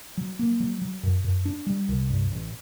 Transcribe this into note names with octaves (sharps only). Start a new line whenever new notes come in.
F#3
A#3
F#3
F#3
F#2
F#2
D4
G3
C2
G2
A1